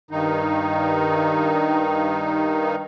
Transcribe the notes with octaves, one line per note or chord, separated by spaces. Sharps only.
G2 D#3 D#4